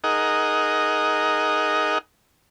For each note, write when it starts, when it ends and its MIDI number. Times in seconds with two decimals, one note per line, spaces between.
0.04 1.98 63
0.04 1.98 68
0.04 1.98 70
0.04 1.98 75
0.04 1.98 78